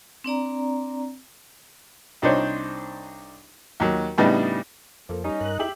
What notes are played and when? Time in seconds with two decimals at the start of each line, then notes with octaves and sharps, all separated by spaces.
0.24 C4 D4 D5 A#5
2.22 C2 D4 D#4 C5 C#5
3.80 D#2 F#3
4.18 A2 C#3 G3 B3 D4 D#4
5.09 F2 F3 A#3 A4
5.24 G3 C#4 D#4
5.40 G2 A#4 F#6
5.59 E4 G4 G#4 E5 F#7